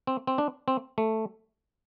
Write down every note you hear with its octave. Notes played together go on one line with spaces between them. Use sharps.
C4
C4
D4
C4
A3